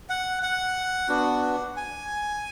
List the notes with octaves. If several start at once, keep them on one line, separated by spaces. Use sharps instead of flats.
F#5
F#5
B3 D4 F#4
G#5